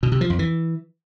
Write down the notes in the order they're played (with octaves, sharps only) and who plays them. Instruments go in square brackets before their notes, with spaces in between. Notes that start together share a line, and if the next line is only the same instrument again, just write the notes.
[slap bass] B2
C3
F3
F2
E3